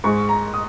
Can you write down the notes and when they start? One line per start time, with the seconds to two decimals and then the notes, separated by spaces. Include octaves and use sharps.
0.04 G#2 G#3 C#6
0.29 A#5
0.54 D#6